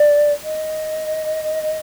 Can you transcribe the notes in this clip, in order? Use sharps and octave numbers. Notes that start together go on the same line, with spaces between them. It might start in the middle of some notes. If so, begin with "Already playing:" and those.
Already playing: D5
D#5